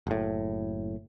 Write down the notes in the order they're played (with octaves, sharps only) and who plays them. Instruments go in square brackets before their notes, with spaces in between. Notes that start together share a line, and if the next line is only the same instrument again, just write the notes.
[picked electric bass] F#1 A2